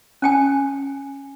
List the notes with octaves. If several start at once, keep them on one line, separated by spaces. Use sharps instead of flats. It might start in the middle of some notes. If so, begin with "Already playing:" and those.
C#4 G5 G#5